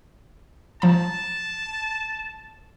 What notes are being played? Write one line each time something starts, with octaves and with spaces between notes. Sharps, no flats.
F3 A5 A#5